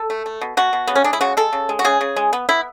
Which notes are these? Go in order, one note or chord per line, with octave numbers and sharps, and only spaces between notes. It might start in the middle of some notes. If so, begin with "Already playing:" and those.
Already playing: A4
A3
A3
B2
B2 F#4
B2
C#3 B3
C#4
G#3 D4
E4
C#3 F#4
G#3 A4
C#3
G#3
F#4
C#3 G#4
C#3
G#3
B3
B3 E4